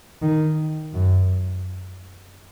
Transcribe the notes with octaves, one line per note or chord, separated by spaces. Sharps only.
D#3
F#2